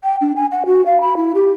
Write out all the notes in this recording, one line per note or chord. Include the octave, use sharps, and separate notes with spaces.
G5
D4
G#5
F#5
F#4
F5
B5
E4
G4